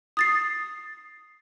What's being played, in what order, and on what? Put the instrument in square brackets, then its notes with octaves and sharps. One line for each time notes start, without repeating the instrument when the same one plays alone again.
[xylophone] D#6 A6 C7